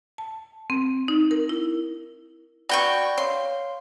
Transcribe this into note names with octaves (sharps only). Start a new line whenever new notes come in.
A5
C4
D#4
A#4
E4
F#4 D5 G5 B5 C#6
C#5 F5 C6